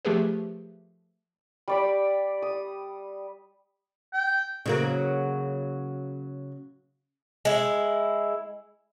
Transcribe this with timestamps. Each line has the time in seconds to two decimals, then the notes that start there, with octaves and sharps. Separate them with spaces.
0.05 F3 A3 G4 G#4 B4
1.68 G3 D5 B5
2.42 D#6
4.13 G5
4.66 C#3 F#3 A#3
7.45 G#3 E4